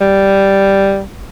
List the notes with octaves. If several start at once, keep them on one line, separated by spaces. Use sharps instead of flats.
G3